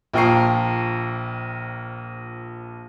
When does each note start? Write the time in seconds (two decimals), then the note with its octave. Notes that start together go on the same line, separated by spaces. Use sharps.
0.13 A#1 F3 G5 A#5 C#6 C7